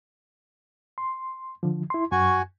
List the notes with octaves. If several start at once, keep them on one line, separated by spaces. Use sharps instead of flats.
C6
D3 F3
E4 C6
F#2 F#4 G#5 C#6